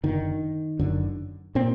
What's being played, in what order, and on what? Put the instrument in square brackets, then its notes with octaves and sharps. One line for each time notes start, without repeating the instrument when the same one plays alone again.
[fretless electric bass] F#1 F#2 D3 D#3
F#1 F#2 D3
A#2 C4